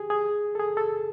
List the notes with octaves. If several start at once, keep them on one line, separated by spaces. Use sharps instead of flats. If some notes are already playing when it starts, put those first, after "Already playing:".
Already playing: G4 G#4
G#4
A4
G#4
A4